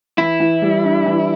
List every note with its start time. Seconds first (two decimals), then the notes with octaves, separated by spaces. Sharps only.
0.18 E3 E4
0.40 E3
0.62 G3
0.84 D4
1.06 E3